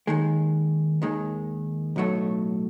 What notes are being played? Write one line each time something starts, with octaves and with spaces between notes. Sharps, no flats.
D#2 D#3 G#3
D#2 D#3 G#3
B1 A2 F#3 A3